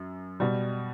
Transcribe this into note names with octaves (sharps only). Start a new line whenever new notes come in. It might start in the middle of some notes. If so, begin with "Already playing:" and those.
Already playing: F#2
B2 G3